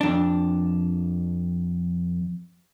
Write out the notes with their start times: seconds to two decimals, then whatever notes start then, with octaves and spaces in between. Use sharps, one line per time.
0.01 F2 D4